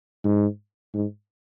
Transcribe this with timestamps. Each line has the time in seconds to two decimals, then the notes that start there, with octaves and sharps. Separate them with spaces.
0.25 G#2
0.94 G#2